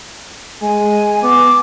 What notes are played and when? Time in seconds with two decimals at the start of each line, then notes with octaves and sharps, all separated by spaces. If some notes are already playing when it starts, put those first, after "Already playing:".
0.62 G#3 G#5
1.23 B3 D6